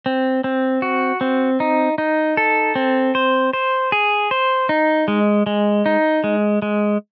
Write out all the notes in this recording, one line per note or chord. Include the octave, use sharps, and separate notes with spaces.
C4
C4
F#4
C4
D#4
D#4
A4
C4
C5
C5
G#4
C5
D#4
G#3
G#3
D#4
G#3
G#3